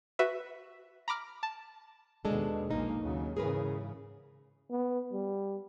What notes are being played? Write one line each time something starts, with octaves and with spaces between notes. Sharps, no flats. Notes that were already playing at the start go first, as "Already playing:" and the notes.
F#4 B4 E5
A#5 B5 D6 F6
A5
D#2 B2 G#3 D4 A4
A#1 G#3 A#3 D#4
D#2 C#3 F#3
G#2 C#3 E3 G#4 A#4 B4
B3
G3